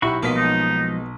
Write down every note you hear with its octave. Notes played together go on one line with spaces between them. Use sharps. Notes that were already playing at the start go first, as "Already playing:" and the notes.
B1 E4 F#4 G4 B5 C#6
B1 B2 F3 G#3 A#3 D#5 B6
D#4